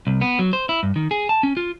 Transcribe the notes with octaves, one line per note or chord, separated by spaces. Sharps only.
C2
B3
F#3
C5
E4
G2
D#3
G#4
A5
C#4
F4